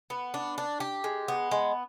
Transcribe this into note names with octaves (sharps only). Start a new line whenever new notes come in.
B3
D4
D4
G4
G#3
B3
G#3